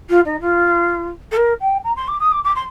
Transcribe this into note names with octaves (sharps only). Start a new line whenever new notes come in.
F4
D#4
F4
A4
A#4
G5
A#5
C6
D6
D#6
D6
D6
C6